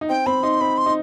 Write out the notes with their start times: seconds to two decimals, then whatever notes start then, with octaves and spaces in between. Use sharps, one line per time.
0.01 D#4
0.09 C4 G5
0.26 C4 B5
0.43 D#4 C6
0.61 C4 B5
0.78 C6
0.86 D#4